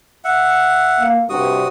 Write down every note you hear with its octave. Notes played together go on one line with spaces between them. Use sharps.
E5 F#5
A#3 F5
G2 C3 F#4 D#6